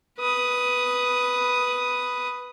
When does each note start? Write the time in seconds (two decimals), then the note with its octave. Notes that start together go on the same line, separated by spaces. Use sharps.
0.19 B4 D#6